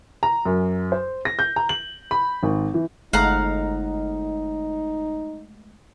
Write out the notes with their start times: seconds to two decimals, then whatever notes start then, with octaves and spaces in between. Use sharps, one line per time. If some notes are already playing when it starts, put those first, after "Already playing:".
0.23 A#5
0.45 F#2
0.92 C5
1.25 A#6
1.39 G6
1.56 A#5
1.69 F#7
2.11 B5
2.43 G#1
2.74 E3
3.13 G1 G#3 A3 D#4 D#5 F5 F#5 A#5